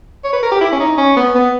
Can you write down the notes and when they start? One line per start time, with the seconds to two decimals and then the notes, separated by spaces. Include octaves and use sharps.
0.24 C#5
0.33 B4
0.42 A#4
0.52 G4
0.61 E4
0.72 C#4
0.80 D#4
0.98 C#4
1.17 B3
1.35 B3